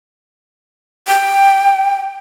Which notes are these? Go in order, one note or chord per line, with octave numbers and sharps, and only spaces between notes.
G5